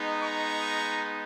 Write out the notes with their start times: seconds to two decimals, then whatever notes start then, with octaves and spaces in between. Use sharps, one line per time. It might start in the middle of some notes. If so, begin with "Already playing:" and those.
Already playing: G#3 B3 D#4
0.22 A#5 C#6